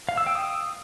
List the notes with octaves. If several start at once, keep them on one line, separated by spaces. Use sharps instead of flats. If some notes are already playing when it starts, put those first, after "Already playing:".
F5
E6
G5
D#6